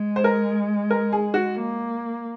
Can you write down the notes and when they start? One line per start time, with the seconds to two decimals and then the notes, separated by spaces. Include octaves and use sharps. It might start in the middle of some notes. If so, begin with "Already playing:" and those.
Already playing: G#3
0.16 C5
0.24 A#4
0.91 A#4
1.12 G#4
1.34 F#4
1.56 A#3